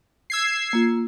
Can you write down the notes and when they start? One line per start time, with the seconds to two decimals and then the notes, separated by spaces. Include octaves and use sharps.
0.30 E6 G#6 C7
0.73 A#3 F4